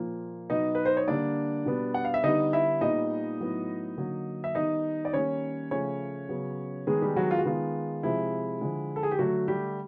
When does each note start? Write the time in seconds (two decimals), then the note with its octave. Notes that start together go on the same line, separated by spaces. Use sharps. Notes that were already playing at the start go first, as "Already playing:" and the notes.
Already playing: A#2 F3 A#3
0.50 B2 F#3 B3 D#4 D#5
0.75 B4
0.86 C5
0.97 C#5
1.08 D3 G3 A#3 D4 D5
1.66 B2 G3 B3
1.94 F#5
2.05 F5
2.14 E5
2.24 D3 G3 B3 D#4 D#5
2.53 E4 E5
2.81 A#2 G3 B3 D#4 D#5
3.40 A2 F#3 B3
3.98 D3 F#3 A#3
4.44 E5
4.55 D#3 G3 B3 D#4 D#5
5.05 D5
5.13 D#3 G3 A#3 C#4 C#5
5.71 C#3 F3 A3 C#4 C#5
6.29 C#3 F#3 B3
6.87 D#3 G#3 B3 G#4
7.02 G3 G4
7.16 F#3 F#4
7.31 F4
7.38 F#4
7.45 D#3 G#3 B3 F4
8.03 C3 F3 G#3 E4
8.61 D3 F3 G#3
8.96 A4
9.03 G#4
9.11 G4
9.19 D3 F#3 A3 F#4
9.48 G3 G4